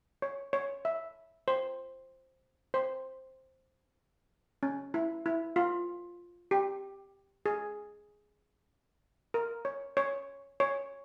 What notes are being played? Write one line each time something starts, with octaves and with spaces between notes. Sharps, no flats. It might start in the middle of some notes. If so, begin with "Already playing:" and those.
C#5
C#5
E5
C5
C5
C#4
E4
E4
F4
G4
G#4
A#4
C#5
C#5
C#5